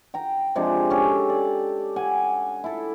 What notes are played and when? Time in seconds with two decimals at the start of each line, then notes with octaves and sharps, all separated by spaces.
0.14 G5 A#5
0.56 C3 F3 G#3 D4
0.90 C#4 G4 A4
1.29 D5
1.96 F#5 G#5
2.64 E4 A4